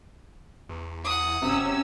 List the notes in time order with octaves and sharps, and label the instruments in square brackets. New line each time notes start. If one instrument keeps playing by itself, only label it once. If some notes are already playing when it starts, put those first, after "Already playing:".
[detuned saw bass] E2
[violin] F#5 D#6
[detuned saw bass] E1 [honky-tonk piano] F#2 C3 [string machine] C#4 E6